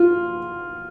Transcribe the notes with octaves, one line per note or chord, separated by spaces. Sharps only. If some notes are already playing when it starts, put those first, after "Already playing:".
Already playing: F4